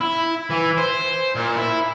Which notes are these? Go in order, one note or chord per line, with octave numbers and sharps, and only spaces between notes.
E4
E3
C5
A#2
E4